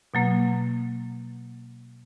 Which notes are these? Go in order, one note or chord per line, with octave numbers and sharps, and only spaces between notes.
B2 F#3 A#3